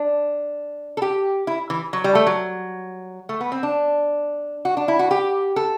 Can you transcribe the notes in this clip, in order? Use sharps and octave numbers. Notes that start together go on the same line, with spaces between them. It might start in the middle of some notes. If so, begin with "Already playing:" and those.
Already playing: D4
A4
G4
E4
E3
F#3
G3
A3
F#3
A3
B3
C4
D4
F#4
D4
E4
F#4
G4
A4